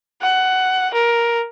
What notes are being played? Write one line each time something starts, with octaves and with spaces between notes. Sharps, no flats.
F#5
A#4